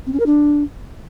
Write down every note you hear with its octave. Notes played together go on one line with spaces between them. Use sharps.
C4
C#4
A#4
D4